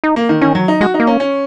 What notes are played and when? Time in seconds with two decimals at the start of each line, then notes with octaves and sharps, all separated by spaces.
0.04 D#4
0.16 A#3
0.29 D#3
0.41 D#3 C#4
0.55 F#3
0.68 D#4
0.81 G#3 F#4
0.94 D#4
1.00 A#3
1.07 C#4
1.20 C#4